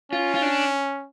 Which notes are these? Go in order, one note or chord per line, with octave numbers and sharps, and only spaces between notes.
C#4 F4
F4
D4